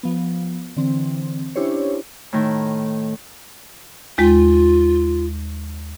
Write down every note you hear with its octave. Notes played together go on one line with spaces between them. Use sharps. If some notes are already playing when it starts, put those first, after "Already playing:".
F3 B3
D3 E3 C4
C#4 D4 E4 G4 C5 C#5
A2 D#3
D#2 G#3 F4